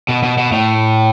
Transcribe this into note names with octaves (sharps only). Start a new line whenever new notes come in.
B2
B2
B2
A2